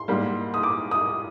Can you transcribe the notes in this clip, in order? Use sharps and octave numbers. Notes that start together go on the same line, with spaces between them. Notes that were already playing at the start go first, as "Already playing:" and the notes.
Already playing: C6
G#2 G3 A#3
D#6
D6
D#6